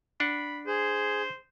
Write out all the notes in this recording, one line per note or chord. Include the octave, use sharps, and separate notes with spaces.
D4 F#5 B5
G#4 C5